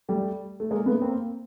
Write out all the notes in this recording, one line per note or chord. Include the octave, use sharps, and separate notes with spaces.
G3 A3
A3
G#3 A#3
A3 B3
A#3 C4